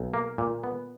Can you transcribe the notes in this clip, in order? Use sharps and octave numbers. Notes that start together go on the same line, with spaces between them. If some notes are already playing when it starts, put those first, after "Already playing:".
Already playing: B1
A#3
A#2
B3